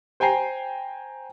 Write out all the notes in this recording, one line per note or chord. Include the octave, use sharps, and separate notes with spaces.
C5 G5 G#5 A#5 C7